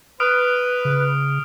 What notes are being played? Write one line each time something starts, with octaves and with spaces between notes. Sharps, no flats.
B4 D#6 F6 D7
C#3